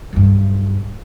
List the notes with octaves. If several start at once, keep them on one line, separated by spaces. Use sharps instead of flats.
B1 G2